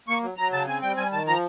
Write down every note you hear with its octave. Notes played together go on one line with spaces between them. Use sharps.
A#3 C#6
F#3
F#3 A#5
C#3 A5
C4 G#5
G3 G5
G3 G#5
D#3 A5
F3 A#5